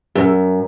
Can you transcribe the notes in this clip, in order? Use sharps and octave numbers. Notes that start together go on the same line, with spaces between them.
F#2